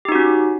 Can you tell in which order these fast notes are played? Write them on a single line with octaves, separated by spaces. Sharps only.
G4 D#4 F#4 C#4